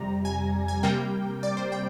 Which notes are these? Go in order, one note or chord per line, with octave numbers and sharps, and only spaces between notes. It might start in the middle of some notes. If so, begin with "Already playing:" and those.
Already playing: F2 C3 G3 A#5
G#5
G#5
C3 G3 A#3 G5
D5
C5
G5